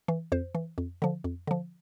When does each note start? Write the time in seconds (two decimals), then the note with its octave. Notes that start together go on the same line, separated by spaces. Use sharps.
0.08 E3
0.32 F2 C5
0.55 E3
0.78 F2
1.02 D3 F3
1.24 F2
1.47 D3 F3